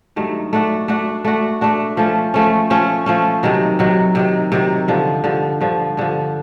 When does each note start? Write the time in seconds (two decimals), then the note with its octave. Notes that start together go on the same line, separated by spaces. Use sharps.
0.16 G2 D#3 F#3 A3
0.53 A3 D4 F#4
0.88 A3 D4 F#4
1.25 A3 D4 F#4
1.61 A3 D4 F#4
1.97 F3 A3 C#4
2.34 F3 A3 C#4
2.70 F3 A3 C#4
3.06 F3 A3 C#4
3.43 C3 D#3 F#3
3.79 C3 D#3 F#3
4.15 C3 D#3 F#3
4.52 C3 D#3 F#3
4.88 G2 D3 F3
5.24 G2 D3 F3
5.61 G2 D3 F3
5.97 G2 D3 F3